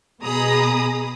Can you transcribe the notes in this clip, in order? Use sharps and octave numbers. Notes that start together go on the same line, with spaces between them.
B2 G#4 A#5 B5 D#6